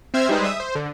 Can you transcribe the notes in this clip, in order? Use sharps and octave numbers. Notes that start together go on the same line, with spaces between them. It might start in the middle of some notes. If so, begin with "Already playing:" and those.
C4 C5 E5 E6 F6 G#6
G3 G#3 D#4 G#4 B4 C5
E5 D#6
C5
D3